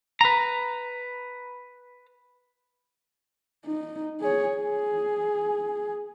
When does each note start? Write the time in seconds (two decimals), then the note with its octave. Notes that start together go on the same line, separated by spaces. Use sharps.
0.21 B4 A#5
3.66 D#4
4.20 G#4 C#5
4.57 G#4